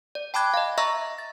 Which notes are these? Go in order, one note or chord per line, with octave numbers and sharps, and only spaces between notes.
D5
G5 A5 B5 D6 F#6 G#6
D#5 F5
D#5 E5 A#5 C#6 E6 A#6
A6